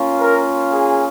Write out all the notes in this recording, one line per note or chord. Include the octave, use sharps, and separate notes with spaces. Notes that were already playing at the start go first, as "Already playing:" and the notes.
Already playing: A#3 C#4 F4
A#4
G#4